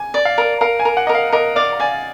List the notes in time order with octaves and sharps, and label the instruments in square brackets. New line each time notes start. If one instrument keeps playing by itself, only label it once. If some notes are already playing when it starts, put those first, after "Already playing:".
Already playing: [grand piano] G#5
[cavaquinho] D5
[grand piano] F5
[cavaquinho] A#4
[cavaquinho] A#4 [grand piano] F5
[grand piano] G#5
[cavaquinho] A#4
[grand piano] F#5
[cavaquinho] A#4 [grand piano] D#5
[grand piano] F5
[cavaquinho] A#4 [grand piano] D#5
[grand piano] D5 [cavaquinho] F5
[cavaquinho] D5 [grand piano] G#5